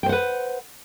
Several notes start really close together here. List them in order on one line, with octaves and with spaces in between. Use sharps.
G5 C5 F#5 B4